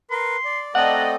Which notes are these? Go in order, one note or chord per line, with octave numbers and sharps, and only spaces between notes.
A#4 B4 C6
D5
A3 C4 A4 D5 D#5 F#5 A#5